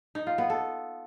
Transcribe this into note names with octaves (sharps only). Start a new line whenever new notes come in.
D#4
F4
B3
A4